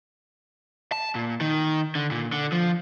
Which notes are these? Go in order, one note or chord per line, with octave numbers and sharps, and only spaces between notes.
A5
A#2
D#3
D3
A#2
D3
F3